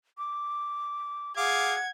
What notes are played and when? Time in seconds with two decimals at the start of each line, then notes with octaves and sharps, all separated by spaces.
0.18 D6
1.37 G#4 F5 F#5 D6 G#6